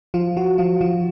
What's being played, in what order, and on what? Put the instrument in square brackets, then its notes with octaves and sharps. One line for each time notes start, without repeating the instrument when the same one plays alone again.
[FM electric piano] F3 F4
F3 F#4
F3 F4
F3 F4